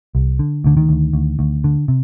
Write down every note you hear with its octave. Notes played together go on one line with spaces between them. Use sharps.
C2
D3
D2 D3
D#3
D2
D2
D2
D3
C3